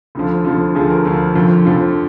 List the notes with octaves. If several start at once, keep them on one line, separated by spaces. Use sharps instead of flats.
D2 D3 F3
D2 D3 F3
D2 D3 F3 G#4
A#4
D2 D3 F3 A#4
F2 D3 F3
F2 D3 F3